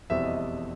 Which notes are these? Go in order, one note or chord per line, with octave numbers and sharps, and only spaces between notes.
F1 E2 B2 G3 C4 E5
D#5
E5